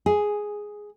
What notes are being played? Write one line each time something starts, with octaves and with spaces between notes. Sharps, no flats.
G#4